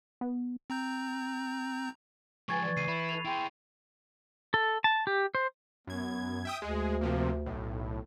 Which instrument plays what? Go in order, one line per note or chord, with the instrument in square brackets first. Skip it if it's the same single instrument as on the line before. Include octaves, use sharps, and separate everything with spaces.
[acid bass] B3
[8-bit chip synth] C4 A#5 G6
[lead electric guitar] F3 G#3 [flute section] B4 G5 G#5 [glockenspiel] C#6 G#6 A6
[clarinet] E3 [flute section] D5
[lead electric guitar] C#2 [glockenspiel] C7 D#7
[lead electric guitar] E4 [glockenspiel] B5
[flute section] A4 B4 [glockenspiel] F7
[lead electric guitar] E4 G#4 [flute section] G5 C6
[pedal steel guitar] A4
A5
G4
C5
[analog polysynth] F#2 G#6 [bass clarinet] B3
[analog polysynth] E5 G5 D#6
[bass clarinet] D2 [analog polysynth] G#3 G#4
[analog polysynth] C3 F3 A#3
B1 A2